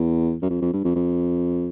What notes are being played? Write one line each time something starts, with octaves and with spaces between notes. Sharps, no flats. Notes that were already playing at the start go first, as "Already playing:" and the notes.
Already playing: E2
F#2
F2
F2
G2
F2
F2